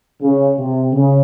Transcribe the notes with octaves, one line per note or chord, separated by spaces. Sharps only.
C#3
C3
C#3